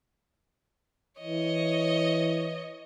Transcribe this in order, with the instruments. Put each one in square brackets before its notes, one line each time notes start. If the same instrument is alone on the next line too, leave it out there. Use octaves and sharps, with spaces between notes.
[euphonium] E3 [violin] C#5 D#5